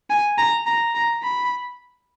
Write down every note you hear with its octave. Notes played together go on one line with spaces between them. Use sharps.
G#5
A#5
A#5
A#5
B5